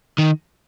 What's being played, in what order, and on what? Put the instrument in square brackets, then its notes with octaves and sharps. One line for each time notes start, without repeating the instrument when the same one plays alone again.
[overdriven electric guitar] D#3